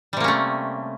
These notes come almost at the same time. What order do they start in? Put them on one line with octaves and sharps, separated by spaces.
G3 C3 A#3 C#4 A3